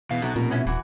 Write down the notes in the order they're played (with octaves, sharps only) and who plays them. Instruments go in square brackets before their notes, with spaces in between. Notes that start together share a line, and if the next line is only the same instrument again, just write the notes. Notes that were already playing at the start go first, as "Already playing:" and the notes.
[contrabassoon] E2 [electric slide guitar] B2 [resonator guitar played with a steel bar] F5
[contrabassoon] B1 [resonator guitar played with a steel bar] C3 F#3 F#4
[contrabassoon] F1 [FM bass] A#2 [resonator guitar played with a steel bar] A#4
[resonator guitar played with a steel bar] B3 C#4 E4
[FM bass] D#1 [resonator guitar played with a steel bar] E3 F#4